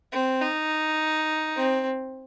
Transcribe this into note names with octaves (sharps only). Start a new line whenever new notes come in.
C4
D#4
C4